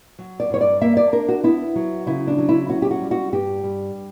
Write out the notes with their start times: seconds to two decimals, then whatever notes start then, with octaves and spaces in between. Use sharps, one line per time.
0.19 F#3
0.40 D5
0.50 G2 C#5
0.61 D5
0.81 A#3 E5
0.97 D5
1.12 D4 A#4
1.29 F#4
1.44 B3 E4
1.76 F#3
2.06 C#3 E4
2.27 D4
2.38 F#3
2.49 E4
2.70 C#4 F#4
2.82 G4
2.91 F#4
3.02 G3
3.11 F#4
3.33 G2 G4
3.64 G3